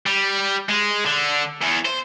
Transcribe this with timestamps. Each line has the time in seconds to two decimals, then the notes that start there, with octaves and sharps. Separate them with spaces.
0.06 G3
0.69 G#3
1.06 D3
1.61 E2
1.85 C5